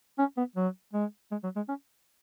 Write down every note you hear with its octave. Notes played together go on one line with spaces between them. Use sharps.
C#4
B3
F#3
G#3
G#3
F#3
G#3
C#4